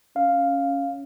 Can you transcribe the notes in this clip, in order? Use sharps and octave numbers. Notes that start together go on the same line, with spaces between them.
C#4 F5